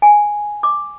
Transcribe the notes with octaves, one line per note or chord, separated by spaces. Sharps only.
G#5
D6